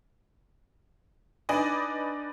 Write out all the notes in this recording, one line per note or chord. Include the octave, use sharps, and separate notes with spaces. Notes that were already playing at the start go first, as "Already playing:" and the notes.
D4 D#4 B4 D5 D#5 G#5